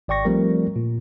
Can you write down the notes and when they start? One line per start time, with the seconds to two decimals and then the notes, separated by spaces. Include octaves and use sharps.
0.08 G#1 D5 G5 C#6 A#6
0.25 F3 G3 A3 C4 A#4
0.76 A#2